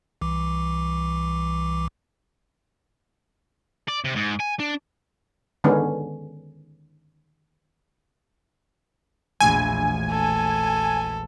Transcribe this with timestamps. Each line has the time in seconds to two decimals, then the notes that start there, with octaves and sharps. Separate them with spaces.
0.21 C2 E3 D6
3.88 D5
4.05 C3
4.16 G#2
4.40 G#5
4.60 D4
5.64 D3 D#3 G#3 B3 C#4
9.40 E1 A#1 A3 G#5
10.11 A4